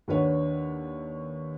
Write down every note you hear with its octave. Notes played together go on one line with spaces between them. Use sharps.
D#2 D4 B4 C#5 F#5